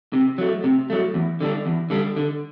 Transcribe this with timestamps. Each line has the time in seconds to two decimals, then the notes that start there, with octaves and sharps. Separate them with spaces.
0.13 C3
0.38 F#3 A3
0.64 C3
0.90 F#3 A3
1.14 E2
1.41 D3 G3 D4
1.66 E2
1.90 D3 G3 D4
2.16 D3